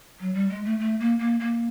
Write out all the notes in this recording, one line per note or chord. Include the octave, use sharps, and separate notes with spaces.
F#3
G3
G#3
A3
A3
A#3
A#3
A#3